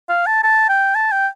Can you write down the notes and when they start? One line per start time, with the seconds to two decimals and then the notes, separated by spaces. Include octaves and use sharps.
0.09 F5
0.26 A5
0.43 A5
0.69 G5
0.95 A5
1.12 G5